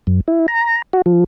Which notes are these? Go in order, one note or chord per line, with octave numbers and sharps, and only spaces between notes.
F#2
E4
A#5
F#4
F3